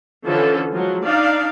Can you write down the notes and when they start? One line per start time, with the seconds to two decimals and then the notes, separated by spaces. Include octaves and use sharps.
0.25 D3 E3 F3 C#4 A4
0.72 F3 F#3 G#3
1.04 D4 D#4 D5 F5